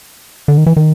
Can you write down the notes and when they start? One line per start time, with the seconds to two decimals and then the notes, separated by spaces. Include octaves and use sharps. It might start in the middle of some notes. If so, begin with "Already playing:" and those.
0.48 D3
0.58 D#3
0.66 E3
0.77 D#3